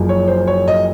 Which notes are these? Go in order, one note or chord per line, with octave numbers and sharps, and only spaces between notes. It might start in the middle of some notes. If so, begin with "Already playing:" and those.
Already playing: F#1 F#2 F3
C#5
C5
C#5
D#5